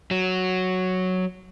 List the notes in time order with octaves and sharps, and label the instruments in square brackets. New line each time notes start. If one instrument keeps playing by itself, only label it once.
[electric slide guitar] F#3